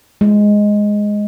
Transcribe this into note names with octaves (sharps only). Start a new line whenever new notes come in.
G#3